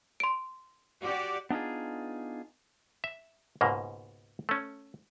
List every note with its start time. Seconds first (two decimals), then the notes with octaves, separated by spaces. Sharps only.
0.20 C6 D7
1.01 F#4 G4 D5
1.51 B3 D4 D#4 F4 G#4
3.04 E5
3.61 C#2 G#2 B2 A#3
4.49 A3 C#4